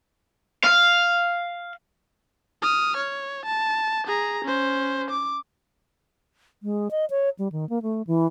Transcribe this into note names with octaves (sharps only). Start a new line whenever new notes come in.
F5
D#6 F6
C#5
A5
G#4 A#5
C#4 C5
D6
G#3
D#5
C#5
G3
D#3
A#3
A3
E3